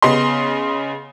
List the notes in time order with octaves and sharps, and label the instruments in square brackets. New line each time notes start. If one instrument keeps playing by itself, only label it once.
[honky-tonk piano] C#3 B3 D#5 C6